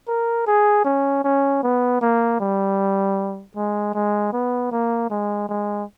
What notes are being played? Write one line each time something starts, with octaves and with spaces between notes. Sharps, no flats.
A#4
G#4
C#4
C#4
B3
A#3
G3
G#3
G#3
B3
A#3
G#3
G#3